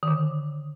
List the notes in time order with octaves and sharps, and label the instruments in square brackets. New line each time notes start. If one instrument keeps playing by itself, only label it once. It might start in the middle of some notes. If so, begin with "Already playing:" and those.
[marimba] D#3
D3